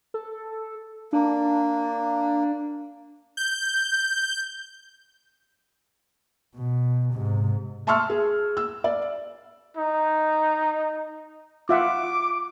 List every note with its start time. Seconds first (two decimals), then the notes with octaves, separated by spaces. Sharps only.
0.14 A4
1.13 A#3 D4
3.37 G6
6.55 B2
7.13 G#2 C3
7.87 E5 A5 C6 C#6 E6 F6
8.10 G#4
8.57 E6
8.84 D5
9.77 D#4
11.69 F4 E5 F#5 D6